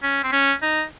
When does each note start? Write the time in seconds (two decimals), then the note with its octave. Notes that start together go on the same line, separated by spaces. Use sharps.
0.02 C#4
0.23 C4
0.32 C#4
0.62 D#4